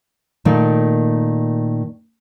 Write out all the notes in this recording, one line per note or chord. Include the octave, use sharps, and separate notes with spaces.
A#2 D#3 A3 A#3